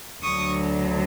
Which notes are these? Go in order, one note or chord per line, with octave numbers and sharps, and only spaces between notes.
D2 D3 F#3 C#6 D#6